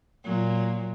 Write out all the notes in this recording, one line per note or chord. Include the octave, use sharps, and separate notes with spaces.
A#2 F#3